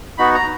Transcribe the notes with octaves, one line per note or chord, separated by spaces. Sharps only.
B3 D#4 F#4 B5
A#5